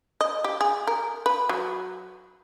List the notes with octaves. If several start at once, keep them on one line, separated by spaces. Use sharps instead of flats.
D#5
G4
G#4
A#4
B4
F#3